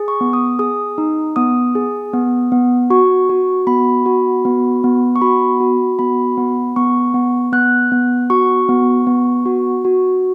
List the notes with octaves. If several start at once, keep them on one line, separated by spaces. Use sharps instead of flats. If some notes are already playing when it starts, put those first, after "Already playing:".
Already playing: G#4
C#6
B3
D#6
G#4 D#6
D#4
B3 D#6
G#4
B3
B3
F#4 C#6
F#4
B3 B5
F#4
B3
B3
C#6
F#4 B5
F#4
B3 B5
B3
B3 C#6
B3
B3 F#6
B3
F#4 C#6
B3
B3
F#4
F#4